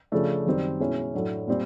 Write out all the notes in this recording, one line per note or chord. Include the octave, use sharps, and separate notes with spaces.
C#3 F3 A3 D4
F#2 D#3 G3 C4
B2 G#3 C#4 E4
A2 F#3 A3 D4
A#2 G3 C4